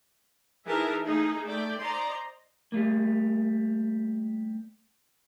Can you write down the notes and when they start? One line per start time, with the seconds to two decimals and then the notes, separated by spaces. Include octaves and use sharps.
0.67 E3 D#4 G#4 A#4 E5 A5
1.06 A3 A#3 D#4 G#4
1.46 A3 D5 G5
1.81 C5 D5 D#5 A#5 C6
2.72 G3 A3 A#3